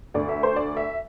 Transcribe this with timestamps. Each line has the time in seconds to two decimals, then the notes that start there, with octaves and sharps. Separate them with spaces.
0.14 D2 D3 D5
0.29 E5
0.43 C5
0.56 D5
0.77 E5